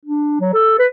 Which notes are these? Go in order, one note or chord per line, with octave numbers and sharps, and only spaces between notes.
D4
F#3
A4
B4